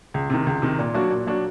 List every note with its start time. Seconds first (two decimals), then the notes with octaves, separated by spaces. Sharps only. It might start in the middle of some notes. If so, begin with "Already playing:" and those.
0.14 C#2
0.30 C3 D#3
0.47 C#2
0.62 C3 D#3
0.79 A#2
0.94 F#3 A#3 D4 F#4
1.11 A#2
1.27 F#3 A#3 D4 F#4